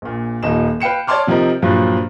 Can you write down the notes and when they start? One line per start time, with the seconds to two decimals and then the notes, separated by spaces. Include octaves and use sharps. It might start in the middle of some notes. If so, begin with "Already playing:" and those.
0.02 A#1 A#2
0.43 D#1 D#2 D#4 E7
0.80 B4 F5 G5 C#7 E7
1.07 C#5 D5 A5 C6 D6 F6
1.27 C3 F3 C4 D#4 A#4
1.62 G2 A#2 F3 F#3